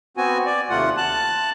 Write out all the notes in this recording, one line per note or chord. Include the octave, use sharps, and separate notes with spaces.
B3 C4 F#4 G#5
D5
D#2 C3 A3 F4 F#5
A5 F#6